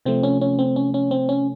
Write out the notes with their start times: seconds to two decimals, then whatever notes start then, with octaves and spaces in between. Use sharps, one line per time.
0.06 C3 F3 A3 C4
0.23 C#4
0.41 C#4
0.59 C4
0.76 C#4
0.94 C#4
1.11 C4
1.29 C#4